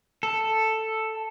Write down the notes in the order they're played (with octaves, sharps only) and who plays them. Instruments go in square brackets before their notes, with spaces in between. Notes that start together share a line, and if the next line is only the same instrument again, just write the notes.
[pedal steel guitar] A4